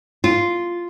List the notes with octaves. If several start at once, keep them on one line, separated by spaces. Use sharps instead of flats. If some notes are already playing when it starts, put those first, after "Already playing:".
F4